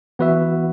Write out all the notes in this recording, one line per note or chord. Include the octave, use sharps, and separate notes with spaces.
E3 B3 F#4 B4 E5